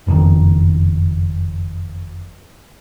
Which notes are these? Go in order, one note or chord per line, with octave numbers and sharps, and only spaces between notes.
F#1 F2 A#2 D#3